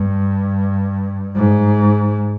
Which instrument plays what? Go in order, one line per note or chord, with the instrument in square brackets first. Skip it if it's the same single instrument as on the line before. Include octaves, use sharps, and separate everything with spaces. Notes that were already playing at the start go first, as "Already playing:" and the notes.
Already playing: [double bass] G2
G#2